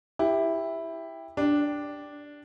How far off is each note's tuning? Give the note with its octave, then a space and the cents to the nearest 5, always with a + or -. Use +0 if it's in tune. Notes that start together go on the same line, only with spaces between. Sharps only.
E4 +0 G4 +15
D4 -5 G4 +0